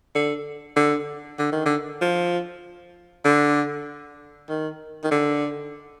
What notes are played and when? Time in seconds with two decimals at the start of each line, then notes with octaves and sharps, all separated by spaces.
0.15 D3
0.76 D3
1.39 D3
1.52 D#3
1.66 D3
2.01 F3
3.25 D3
4.49 D#3
5.04 D#3
5.11 D3